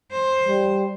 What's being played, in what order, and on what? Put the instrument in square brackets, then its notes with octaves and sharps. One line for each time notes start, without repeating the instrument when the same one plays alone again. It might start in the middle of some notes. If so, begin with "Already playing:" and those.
[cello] C5
[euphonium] G3